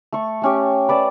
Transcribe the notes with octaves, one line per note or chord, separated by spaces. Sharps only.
A3 C#6
A3 C#4 G4
B4 D5 A5